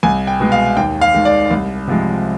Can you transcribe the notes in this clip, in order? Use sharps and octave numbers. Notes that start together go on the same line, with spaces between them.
C2 G#5
G5
B2 G#3
F5
D#2 G5
F5
D#3 G#3
D5
C2
C3 F3 G#3